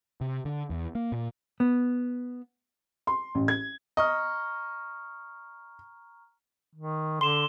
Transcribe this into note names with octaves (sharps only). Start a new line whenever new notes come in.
C3
D3
E2
A#3
A#2
B3
C6
A1
G#6
D#5 A#5 C#6 F6
D#3
D3 C6 E7 G7